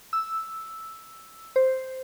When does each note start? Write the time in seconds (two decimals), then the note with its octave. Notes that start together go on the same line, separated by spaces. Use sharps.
0.13 E6
1.56 C5